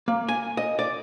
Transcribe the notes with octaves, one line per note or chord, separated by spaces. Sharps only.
A#3
G#5
D#5
D5